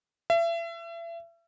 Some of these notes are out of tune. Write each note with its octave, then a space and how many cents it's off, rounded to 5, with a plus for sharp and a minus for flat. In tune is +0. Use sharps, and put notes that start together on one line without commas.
E5 +35